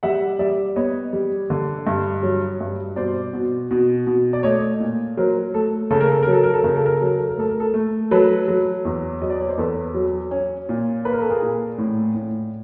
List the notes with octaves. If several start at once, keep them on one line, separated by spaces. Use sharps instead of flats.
G3 E5 F#5
G3 D5 E5
B3 C#5 D#5
G3
D3
G2
F#3
G2
B2 C5 D5
B2
B2
B2
D5
A3 C#5 D#5
A#2
F#3 A#4 C5
A3 A4
C#3 A4
A#4
A4
F#3 A#4
A4
A#4
A4
C#3 A#4
A4
A#4
F#3 A4
A#4
A4
A#4
A3 A4
A#4
A4
A3
F#3 A4 B4
F#3
E2
F#3 D#5
D5
C#5
C5
E2 A4 B4
F#3
C#4
A#2
A#3 B4
A#4
A4
G#4 A#4
A#2
A2
A2